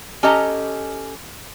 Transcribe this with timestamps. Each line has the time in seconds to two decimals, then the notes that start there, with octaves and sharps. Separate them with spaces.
0.23 C#4 G4 A4 D#5 A#5